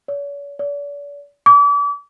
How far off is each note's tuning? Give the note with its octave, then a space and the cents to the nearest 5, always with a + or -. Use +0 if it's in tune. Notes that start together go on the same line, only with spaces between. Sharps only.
C#5 +45
D5 -40
D6 -35